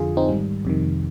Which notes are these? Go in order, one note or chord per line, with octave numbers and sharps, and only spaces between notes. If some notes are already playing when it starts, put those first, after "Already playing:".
Already playing: F2 D3 F4 G#4
C4 D#4
G#2 D#3 G3
F2 C3 D#3